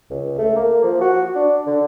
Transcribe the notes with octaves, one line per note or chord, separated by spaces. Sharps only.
C#2
A3
A#3
F3
F#4
D4
D3